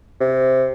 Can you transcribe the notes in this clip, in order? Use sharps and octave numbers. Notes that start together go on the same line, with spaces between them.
C3